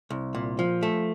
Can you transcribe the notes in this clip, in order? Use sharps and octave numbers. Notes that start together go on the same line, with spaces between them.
C2
A#2
F3
A3